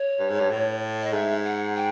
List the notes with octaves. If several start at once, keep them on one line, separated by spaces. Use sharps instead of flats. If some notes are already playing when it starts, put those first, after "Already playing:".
Already playing: C#5
G2
G#2
G2
A2
D#5
G#2 E5
F#5
G5